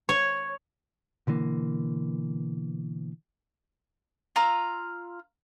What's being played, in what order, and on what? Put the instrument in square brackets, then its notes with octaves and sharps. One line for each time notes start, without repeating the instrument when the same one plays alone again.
[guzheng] C#5
[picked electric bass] B2 D3 E3 A#3
[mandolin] F4 A#5 E6